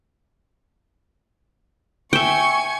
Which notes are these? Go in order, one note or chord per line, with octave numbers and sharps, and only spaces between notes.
E5 G5 G#5 C#6